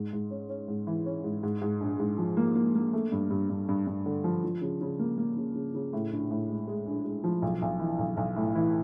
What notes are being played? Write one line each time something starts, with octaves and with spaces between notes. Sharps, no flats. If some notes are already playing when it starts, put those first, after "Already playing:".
Already playing: G#2
G#2
C#4
C#4
G#2
E3
C#4
G#2
G#2
G#2
A#1
G#2
F3
A#3
A#3
A#3
A3
G2
G2
G2
G2
G2
D3
F3
F3
C#3
C#3
A#3
A#3
C#3
C#3
C#3
A2
A#1
A2
G#3
G#3
A#1
G#3
F3
B1
B1
E3
B1
B1
A2
E3